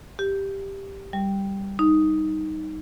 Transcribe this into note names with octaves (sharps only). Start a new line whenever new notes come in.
G4
G3
D#4